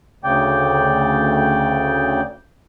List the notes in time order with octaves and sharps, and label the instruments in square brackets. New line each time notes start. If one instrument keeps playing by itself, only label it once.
[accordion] D2 C#3 D5 G5